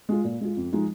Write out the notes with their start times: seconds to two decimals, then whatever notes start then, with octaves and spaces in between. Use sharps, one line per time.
0.09 G#3 F4
0.25 A#2
0.41 G#3 F4
0.57 F2
0.73 F3 G#3 D#4